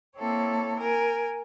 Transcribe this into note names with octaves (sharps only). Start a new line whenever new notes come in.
A#3 C4 E4 A4 C#5
A#4 G#5